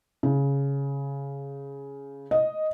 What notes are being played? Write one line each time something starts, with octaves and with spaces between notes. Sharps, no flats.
C#3
D#5